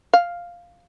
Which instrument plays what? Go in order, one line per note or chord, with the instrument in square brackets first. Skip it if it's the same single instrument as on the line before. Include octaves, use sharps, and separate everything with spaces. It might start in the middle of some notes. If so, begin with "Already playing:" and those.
[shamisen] F5